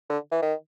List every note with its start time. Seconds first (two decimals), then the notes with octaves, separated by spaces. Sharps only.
0.10 D3
0.32 E3
0.42 D#3